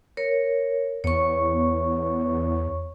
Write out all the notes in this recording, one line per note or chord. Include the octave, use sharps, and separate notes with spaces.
A#4 C#5
E2 C#5 C#6